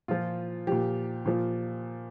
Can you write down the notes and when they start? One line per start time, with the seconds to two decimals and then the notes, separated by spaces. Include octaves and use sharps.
0.08 A#2 F3 F4
0.67 A#2 F3 G4
1.26 A#2 F3